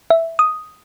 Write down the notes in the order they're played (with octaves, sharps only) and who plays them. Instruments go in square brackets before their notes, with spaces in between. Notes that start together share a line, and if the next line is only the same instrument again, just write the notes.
[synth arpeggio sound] E5
D#6